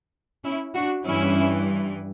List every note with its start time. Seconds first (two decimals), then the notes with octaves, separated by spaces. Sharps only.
0.44 C#4 E4
0.74 D4 F#4
1.05 G2 E3 C#4 E4